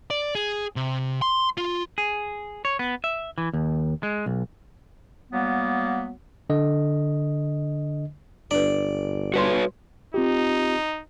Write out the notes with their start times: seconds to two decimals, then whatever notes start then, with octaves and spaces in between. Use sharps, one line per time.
0.10 D5
0.35 G#4
0.76 C3
1.22 C6
1.57 F4
1.98 G#4
2.65 C#5
2.79 B3
3.04 E5
3.38 E3
3.53 D#2
4.03 G#3
4.26 B1
5.32 F#3 G3 A#3 B3
6.50 D3 D#5
8.51 G1 D4 B4 D5
9.34 G3 F#4 B4 C#5 C6
10.14 C4 D#4 F4 G4